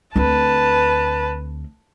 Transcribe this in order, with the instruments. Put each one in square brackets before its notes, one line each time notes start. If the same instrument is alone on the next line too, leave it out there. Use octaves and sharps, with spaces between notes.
[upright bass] D2 C4 [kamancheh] B4 A5